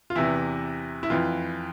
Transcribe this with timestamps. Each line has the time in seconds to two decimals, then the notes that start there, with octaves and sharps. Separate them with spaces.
0.10 F4
0.15 E2 C3 E3 E4
1.03 E4
1.10 F2 E3 F4